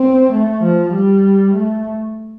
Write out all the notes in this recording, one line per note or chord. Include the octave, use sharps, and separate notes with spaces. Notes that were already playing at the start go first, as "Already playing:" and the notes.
Already playing: C4
A3
F3
G3
A3